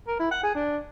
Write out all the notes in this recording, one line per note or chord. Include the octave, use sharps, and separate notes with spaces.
A#4
E4
F#5
G#4
D4